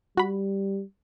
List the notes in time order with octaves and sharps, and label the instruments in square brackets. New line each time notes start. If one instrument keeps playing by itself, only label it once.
[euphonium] G3 [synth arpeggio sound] F#4 B5